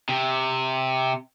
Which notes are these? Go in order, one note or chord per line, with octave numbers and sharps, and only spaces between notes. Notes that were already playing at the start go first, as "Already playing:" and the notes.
C3